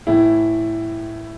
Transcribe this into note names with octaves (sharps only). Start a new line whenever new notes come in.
A2 E3 E4